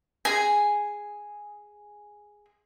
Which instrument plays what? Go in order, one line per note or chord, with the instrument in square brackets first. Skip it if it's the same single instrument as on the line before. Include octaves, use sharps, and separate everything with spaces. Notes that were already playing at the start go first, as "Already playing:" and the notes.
[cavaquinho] G#4 G#5